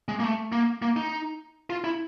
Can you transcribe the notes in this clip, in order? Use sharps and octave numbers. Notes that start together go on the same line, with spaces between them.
G#3
A#3
A3
A#3
A#3
D#4
F4
E4